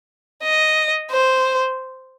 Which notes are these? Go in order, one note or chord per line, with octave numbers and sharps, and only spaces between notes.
D#5
C5